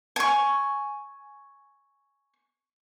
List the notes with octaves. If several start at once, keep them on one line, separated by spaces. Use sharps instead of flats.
G#5 C#6